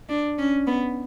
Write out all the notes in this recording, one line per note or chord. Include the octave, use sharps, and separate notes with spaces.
D4
C#4
B3